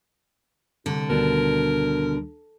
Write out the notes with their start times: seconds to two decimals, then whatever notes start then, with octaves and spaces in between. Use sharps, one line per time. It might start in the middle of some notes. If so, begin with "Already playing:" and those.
0.86 C2 D3
1.10 D2 B2 D#3 G3 A#4